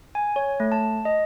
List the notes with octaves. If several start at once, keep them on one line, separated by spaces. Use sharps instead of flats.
G#5
C#5
A3
A5
D#5